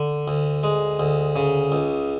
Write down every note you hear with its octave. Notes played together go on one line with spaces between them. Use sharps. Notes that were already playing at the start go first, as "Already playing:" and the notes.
Already playing: D3
D2
G#3
D2
C#3
C#2